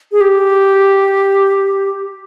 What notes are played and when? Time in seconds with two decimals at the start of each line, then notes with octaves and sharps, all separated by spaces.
0.12 G#4
0.21 G4